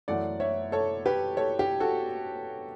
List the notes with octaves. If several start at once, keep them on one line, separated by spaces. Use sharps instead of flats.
F#2 E3 A3 D5 F#5
C#5 E5
A4 C#5
G4 B4
A4 C#5
G4
F#4 A4